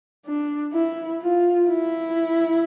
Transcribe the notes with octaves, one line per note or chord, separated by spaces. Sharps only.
D4
E4
F4
E4